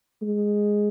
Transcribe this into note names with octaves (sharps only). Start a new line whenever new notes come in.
G#3